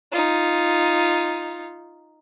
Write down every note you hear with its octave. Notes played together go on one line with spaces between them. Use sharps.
D#4 F4